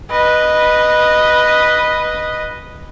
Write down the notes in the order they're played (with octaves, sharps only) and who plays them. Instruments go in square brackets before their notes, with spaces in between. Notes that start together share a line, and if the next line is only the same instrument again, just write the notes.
[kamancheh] B4 D#5